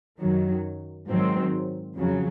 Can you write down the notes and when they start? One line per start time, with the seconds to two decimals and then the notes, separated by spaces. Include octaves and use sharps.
0.19 F#2 D#3 F#3
1.07 G#2 D#3 F#3 C4
1.97 F2 C#3 F#3